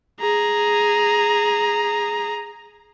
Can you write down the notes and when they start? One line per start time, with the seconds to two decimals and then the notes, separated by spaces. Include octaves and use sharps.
0.21 G#4 A#5